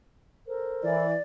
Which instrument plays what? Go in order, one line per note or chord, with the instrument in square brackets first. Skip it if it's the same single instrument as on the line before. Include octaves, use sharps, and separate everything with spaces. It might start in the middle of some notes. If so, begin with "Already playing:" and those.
[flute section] A4 A#4 C5
[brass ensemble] E3 [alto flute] D5